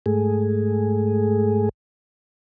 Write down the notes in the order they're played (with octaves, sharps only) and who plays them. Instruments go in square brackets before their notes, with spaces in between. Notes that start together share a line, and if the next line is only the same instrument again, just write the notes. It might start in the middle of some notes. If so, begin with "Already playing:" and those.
[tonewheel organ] G#2 A3 G#4